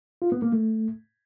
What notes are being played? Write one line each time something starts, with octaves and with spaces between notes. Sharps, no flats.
F4
B3
A#3
A3